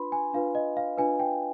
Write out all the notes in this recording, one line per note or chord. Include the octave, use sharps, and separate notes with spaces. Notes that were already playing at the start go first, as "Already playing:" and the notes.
Already playing: D4 F4 B4 B5 C6
G#5
D4 F4 B4 F5
D#5
F5
D4 F4 B4 G#5
G5